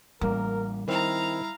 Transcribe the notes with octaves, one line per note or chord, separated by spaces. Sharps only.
A1 G3 A#3 A#4
D#3 C4 E4 F5 A#5